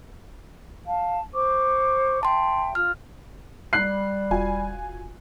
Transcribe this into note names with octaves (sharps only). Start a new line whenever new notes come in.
F5 A5
C5 C#6 D6
E5 G5 A5 C6
F4 F6
G3 F#6 C7
E1 F4 F#4 G#5